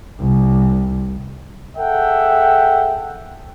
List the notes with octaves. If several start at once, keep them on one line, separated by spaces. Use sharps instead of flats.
C2
G#4 A4 E5 F#5 G5